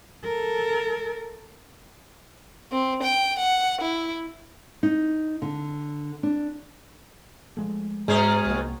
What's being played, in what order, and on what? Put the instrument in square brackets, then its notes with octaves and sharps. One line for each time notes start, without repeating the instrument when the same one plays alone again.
[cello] A4 A#4
[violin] C4
G5
F#5
E4
[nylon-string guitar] D#4
D3
D4
[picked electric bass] F3 G#3 A3
[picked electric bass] G#2 [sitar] B2 C#4 G#4 [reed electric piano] G#3 [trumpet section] A#5
[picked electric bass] C2 A#3 [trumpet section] C4 D#4 F#4